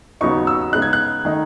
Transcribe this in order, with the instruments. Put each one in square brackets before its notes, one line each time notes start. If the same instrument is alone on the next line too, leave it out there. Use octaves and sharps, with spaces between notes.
[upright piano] D#2 C#3 F#3 B3 D#4 C#6
E6
C#3 G#3 B3 D#4 F#6
G#6
F#6
D#3 A3 D#4